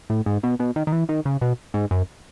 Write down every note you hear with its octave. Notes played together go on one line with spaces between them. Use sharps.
A2
G#2
B2
B2
D#3
D#3
E3
D#3
C#3
B2
G#2
F#2